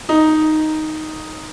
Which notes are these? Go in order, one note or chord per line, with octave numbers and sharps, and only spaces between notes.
D#4